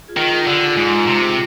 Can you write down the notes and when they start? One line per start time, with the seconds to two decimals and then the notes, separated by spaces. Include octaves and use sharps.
0.08 F4 G#4
0.17 D#3
0.32 F4 G#4
0.47 D3 G4
0.54 F4 G#4
0.77 G#2 F4 G#4
1.07 C3
1.23 F4 G#4